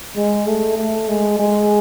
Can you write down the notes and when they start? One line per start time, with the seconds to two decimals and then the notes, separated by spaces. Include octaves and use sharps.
0.17 G#3
0.47 A3
0.77 A3
1.09 G#3
1.39 G#3